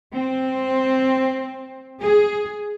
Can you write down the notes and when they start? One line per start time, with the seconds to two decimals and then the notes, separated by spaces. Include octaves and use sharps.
0.12 C4
2.01 G#4